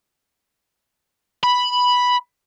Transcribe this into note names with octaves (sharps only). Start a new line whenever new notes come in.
B5